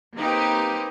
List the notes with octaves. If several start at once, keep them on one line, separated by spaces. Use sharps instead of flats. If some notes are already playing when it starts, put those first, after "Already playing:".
A#3 C4 D#4 G4 B4